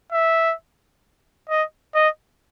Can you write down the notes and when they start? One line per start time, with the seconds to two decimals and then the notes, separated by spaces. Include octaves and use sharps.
0.12 E5
1.49 D#5
1.95 D#5